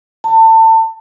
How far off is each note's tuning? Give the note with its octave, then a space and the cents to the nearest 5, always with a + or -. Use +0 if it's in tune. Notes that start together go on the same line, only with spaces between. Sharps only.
A5 +30